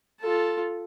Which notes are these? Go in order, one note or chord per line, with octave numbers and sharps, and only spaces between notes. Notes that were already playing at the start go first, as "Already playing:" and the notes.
F4 A4